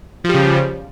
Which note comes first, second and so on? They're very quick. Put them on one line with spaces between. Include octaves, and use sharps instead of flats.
F3 G3 C#3